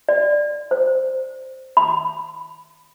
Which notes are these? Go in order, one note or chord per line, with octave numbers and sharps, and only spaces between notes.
D5
C5
B5